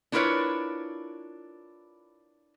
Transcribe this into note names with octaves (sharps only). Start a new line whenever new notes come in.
D4 E4 F4 A#4 B4 C#5